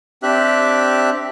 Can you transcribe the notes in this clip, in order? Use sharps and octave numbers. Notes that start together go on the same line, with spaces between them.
C4 D4 G4 E5 F#6